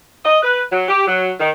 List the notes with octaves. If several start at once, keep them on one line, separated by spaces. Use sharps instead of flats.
D#5
B4
F#3
G4
F#3
D#3